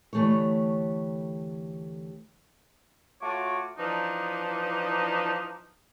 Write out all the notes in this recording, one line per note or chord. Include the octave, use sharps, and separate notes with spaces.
D2 E3 A3 G4 C#5
A3 F4 F#4 C#5 D6
E3 F3 D4 D#4